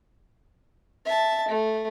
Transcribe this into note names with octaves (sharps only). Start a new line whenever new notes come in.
E5 A5
A3